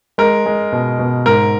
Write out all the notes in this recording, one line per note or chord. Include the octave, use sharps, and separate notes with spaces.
G#3 A#4
G#3
B2
B2
G#2 A#4